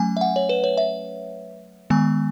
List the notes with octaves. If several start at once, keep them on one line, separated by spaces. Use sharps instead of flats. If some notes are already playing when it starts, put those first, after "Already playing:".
Already playing: F#3 A3 C#4 G#5
E5
F#5
C#5
B4
C#5
E5
D#3 G#3 B3 G#5